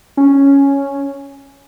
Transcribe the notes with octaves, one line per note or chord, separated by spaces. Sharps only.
C#4